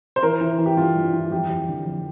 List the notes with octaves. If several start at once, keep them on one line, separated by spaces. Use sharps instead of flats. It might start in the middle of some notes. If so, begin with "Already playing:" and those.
C5
E3 A#4
E3
E3
G4
G2 F4
G2
E3
F2 G4
F2
D3
F2